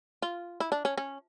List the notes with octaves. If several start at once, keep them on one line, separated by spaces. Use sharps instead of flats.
F4
E4
D4
C#4
C#4